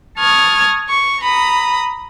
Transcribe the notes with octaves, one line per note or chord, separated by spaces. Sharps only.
A5 C#6 D#6 F6 G#6
C#6
A#5 B5 D#6